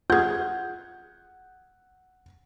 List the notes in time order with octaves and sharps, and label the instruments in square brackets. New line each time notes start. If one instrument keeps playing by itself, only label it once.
[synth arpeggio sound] F4 G#4 [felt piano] F#5 [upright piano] G6 G#6